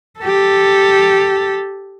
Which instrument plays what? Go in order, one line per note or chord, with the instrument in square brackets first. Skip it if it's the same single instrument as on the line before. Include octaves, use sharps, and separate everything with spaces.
[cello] G4 A4